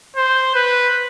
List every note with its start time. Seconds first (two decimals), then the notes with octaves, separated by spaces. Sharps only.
0.16 C5
0.55 B4